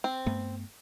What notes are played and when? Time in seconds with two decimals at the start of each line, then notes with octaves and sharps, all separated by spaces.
0.04 C4
0.26 G2 A3 B3